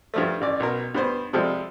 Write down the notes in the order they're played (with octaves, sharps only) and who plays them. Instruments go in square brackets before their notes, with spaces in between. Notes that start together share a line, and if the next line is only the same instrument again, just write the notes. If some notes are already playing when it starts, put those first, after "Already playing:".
[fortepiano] G2 F3 A3
A1 D5
B1 A#4
G2 B3 C5
C3 F3 G3 G#3 A4